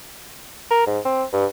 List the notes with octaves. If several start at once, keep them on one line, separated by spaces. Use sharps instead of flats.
A#4
G#2
C4
G2